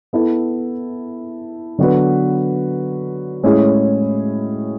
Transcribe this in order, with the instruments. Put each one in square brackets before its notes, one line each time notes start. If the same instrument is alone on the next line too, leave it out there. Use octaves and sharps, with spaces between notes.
[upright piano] B3 E4 A4
D3 F#3 B3 F#4 B4
A2 G#3 C#4 E4 G#4